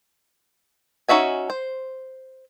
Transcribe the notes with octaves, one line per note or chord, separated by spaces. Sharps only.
C#4 D#4 F#4 E5 G#5
C5